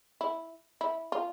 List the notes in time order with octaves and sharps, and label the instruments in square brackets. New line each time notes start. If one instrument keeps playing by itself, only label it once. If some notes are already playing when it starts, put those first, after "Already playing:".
[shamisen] E4
E4
F4